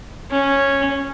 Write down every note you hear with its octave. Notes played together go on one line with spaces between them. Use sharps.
C#4